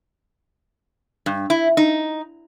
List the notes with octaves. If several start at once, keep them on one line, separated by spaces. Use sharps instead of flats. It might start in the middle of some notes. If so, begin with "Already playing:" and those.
G2
E4
D#4